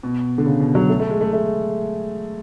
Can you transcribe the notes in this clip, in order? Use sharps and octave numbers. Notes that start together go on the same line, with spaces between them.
B2
D3
C#3
B2
F#3
A3
A3
G#3
A3
A3